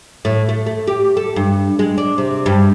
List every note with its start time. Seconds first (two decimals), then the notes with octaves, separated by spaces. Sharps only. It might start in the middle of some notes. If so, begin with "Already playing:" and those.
0.25 A2
0.49 A3
0.66 A3
0.87 G4
1.17 A4
1.36 G2
1.79 G#3
1.98 D4
2.18 C3
2.46 G2